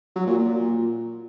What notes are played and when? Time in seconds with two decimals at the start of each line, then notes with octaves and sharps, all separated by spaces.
0.16 F#3
0.27 A#2
0.38 A#2